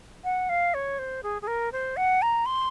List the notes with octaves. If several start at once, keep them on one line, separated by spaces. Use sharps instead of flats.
F#5
F5
C#5
C5
G#4
G#4
A#4
C5
F#5
A#5
C6